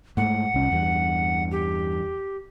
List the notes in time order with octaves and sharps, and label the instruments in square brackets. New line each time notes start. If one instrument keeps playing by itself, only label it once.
[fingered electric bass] G#2 A3 [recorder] F#5
[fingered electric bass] C2 C#4
E2 G2
[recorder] G4